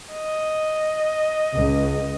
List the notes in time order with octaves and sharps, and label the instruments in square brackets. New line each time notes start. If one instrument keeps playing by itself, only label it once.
[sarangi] D#5
[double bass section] C#2